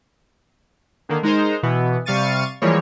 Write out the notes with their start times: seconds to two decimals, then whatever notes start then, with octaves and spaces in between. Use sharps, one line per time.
1.09 D3 D#3 A#3
1.23 G#3 D#4 A#4 C5
1.63 B2 E3 B3
2.05 C3 G3 F5 C#6 A6 D#7
2.62 E3 F3 G3 G#3 A#3 C#5